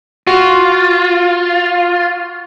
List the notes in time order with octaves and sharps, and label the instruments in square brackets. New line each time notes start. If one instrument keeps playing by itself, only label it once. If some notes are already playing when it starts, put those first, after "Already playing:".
[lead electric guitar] F4 [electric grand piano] F#4